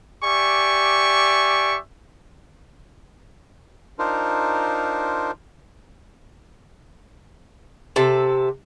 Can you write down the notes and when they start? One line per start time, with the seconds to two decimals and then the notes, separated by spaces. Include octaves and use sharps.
0.24 G4 D5 E5 G#5 C#6
3.99 D4 D#4 F4 A#4 C5
7.96 C3 A4